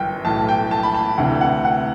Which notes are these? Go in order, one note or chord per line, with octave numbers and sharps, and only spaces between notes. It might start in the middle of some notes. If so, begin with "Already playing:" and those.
Already playing: G1 F#2 E3 G5
B1 A2 E3 A5
G5
A5
B5
A5
D2 C3 E3 F#5
F#5
F#5